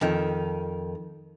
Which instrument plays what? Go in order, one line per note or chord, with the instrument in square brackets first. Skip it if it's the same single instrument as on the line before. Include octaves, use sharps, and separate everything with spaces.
[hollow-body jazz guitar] F2 D#3